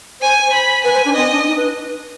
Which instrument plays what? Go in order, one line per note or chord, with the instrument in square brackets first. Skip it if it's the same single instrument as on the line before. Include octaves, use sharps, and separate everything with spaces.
[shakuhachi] C5 [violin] G#5
[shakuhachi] C5
[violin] B5
[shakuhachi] B4 [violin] G#5
[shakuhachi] C5
D4
[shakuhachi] C4 [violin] D#5
[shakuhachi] D4
D#4
B4